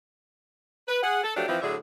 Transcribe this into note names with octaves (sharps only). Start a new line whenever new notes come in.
B4
G#4 F#5
A4
F3 F#3 A3 D4 F#4 G4
E3 F3 C4
A2 D3 F#3 D4 G#4 E5